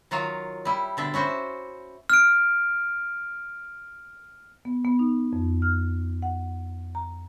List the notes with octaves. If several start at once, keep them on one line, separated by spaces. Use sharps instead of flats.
D#3 F#3 F4 F5
G3 E4
B2 D3 E5
C#4 E4 F#4 C5
F6 D7
B3
B3
D#4
F2
F6
F#5
A#5